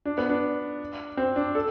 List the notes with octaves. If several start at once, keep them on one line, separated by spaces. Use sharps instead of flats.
D4
B3
D4
C4
D4
A4